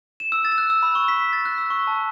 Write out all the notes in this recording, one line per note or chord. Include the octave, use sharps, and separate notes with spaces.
E7
E6
A6
E6
F#6
E6
B5
C#6
B6
B6
A6
F#6
E6
C#6
A5